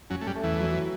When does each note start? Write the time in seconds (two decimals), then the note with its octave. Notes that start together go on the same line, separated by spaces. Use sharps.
0.10 F#2 F#3 C#4
0.21 A3
0.27 G2 G3
0.35 A3
0.43 E2 E3
0.60 F#3